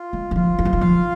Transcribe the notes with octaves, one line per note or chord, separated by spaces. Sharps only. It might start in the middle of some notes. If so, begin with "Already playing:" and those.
Already playing: F4
G#3
D#3
F3 F4
D#3
F3
D#3
F3 F5